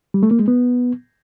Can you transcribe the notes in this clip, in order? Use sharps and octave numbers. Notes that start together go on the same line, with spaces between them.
G3
A3
A#3
G#3
B3